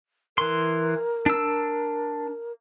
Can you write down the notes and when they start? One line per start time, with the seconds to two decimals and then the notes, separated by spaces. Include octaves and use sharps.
0.38 E3 A#4 C6
1.26 D4 E6